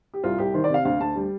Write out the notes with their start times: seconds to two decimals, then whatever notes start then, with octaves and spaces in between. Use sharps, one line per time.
0.14 G4
0.24 C2 F4
0.38 C2 G4
0.54 D#3 C5
0.64 D5
0.69 C3
0.74 F5
0.85 D2 F5
1.00 D2 A5
1.16 G3